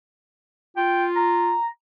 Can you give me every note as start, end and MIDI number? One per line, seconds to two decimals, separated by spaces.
0.77 1.54 65
0.77 1.05 79
1.16 1.67 82